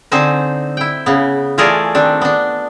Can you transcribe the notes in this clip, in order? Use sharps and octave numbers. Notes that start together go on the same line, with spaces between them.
D3 C4 D#4 C5 G#5
E4 G5
C#3 B3
E3 A3 F4 G#4 A#4 D5
D#3 C4 D4
B3 D4